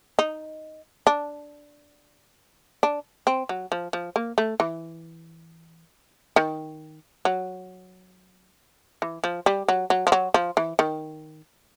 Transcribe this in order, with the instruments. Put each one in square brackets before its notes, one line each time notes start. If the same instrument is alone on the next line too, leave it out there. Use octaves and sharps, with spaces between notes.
[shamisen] D#4
D4
D4
C4
F#3
F3
F3
A#3
A3
E3
D#3
F#3
E3
F3
G3
F#3
F#3
F3
F#3
F3
E3
D#3